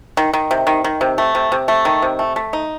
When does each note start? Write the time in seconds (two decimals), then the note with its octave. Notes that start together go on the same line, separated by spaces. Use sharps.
0.17 D#3
0.33 D#3
0.51 C3
0.67 D#3
0.84 D#3
1.01 C3
1.18 A3
1.35 C3
1.52 C3
1.68 A3
1.85 D#3
2.02 C3
2.19 A3
2.36 A3
2.53 D#4